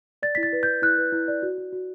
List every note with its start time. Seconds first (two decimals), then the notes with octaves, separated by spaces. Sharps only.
0.23 D5 A6
0.35 E4 B6
0.43 A6
0.53 B4
0.63 E4 G6
0.82 E4 F#6
0.98 B4
1.13 E4
1.28 D5
1.43 F#4
1.58 F#4
1.73 F#4